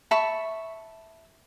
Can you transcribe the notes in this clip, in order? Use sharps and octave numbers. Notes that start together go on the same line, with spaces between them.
E5 A5 B5 C#6